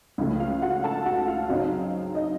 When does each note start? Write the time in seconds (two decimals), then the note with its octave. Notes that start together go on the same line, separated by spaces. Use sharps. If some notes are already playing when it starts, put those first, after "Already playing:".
0.18 C#2 C#3 F3 A3
0.40 F4 F5
0.62 F#4 F#5
0.84 A4 A5
1.06 F#4 F#5
1.27 F4 F5
1.49 F#2 C#3 F#3 C4 D#4
2.15 D#4 D#5